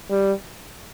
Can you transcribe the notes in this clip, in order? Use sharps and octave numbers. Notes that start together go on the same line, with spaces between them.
G3